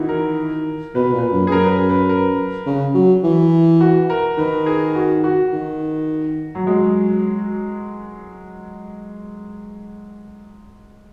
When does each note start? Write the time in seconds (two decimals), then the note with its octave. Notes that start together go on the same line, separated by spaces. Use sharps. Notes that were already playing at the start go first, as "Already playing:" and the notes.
Already playing: D#3 E3 D#4 E4 F#4
0.09 A#4
0.95 B2 B4
1.13 A#2
1.19 B4
1.32 F#2
1.47 G#4
1.52 F#2 A#4
1.63 B4
1.71 A#4
1.90 B4
2.09 A#4
2.66 C#3
2.94 F#3
3.23 E3
3.81 F#4
4.10 A#4
4.38 D#3 B4
4.66 G#4
4.95 F#4
5.24 F#4
5.52 D#3
6.55 F#3
6.67 F#3 G#3